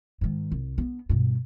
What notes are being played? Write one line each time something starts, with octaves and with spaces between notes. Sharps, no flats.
G#2 D#3
C2
B3 D4
G2 B2